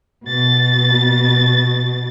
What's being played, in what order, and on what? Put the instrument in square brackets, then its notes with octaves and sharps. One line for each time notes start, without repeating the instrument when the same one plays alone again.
[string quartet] B2 A6